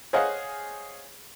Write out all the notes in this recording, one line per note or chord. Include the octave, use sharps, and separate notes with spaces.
G#4 C5 C#5 D#5 F5 F#5